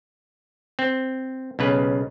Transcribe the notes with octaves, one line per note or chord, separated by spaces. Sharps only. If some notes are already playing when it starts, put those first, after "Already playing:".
C4
B1 C#3 B4